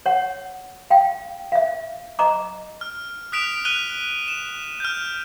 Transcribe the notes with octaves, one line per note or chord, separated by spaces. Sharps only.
C#5 F#5
F5 G5
E5 F5
D#5 A#5 D6
F6
D#6 F#6 B6 D7 E7 F7
F#6 D#7 F7 G7
E7
F6 G6